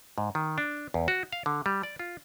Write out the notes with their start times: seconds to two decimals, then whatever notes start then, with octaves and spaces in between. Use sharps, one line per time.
0.18 G#2
0.35 D#3
0.58 D4
0.94 E2
1.08 F#4
1.32 F5
1.46 D3
1.66 G3
1.83 D5
1.99 F4